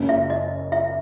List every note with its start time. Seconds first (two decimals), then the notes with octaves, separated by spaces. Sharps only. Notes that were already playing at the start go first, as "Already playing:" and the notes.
Already playing: F#1 F#2 C#3
0.09 E5
0.30 D#5
0.72 E5